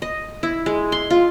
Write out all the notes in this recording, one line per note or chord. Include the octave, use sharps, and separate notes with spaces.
D#5
E4
G#3
C6
F4